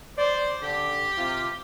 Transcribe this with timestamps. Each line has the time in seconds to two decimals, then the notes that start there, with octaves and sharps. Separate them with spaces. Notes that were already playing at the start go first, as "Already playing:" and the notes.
0.18 C5 D5
0.62 D3 G4
1.17 C3 F4